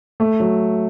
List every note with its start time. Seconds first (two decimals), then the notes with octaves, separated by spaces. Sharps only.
0.20 A3
0.40 F#3